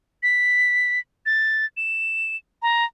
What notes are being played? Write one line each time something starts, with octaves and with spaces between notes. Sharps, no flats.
B6
A6
E7
A#5